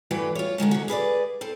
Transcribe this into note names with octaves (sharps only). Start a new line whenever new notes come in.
G2 E3 A3 F#4 B4 G5
F4 C#5
D3 D#3 G#3 A3
C3 F#4
G#4 B4 C#5 D5
C4 A4